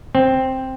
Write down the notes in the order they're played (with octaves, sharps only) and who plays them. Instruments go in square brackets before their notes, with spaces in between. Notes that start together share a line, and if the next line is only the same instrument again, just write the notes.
[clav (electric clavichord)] C4